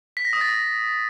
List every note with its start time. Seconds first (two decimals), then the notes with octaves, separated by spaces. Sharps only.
0.17 B6
0.25 A#6
0.33 D#6
0.41 A6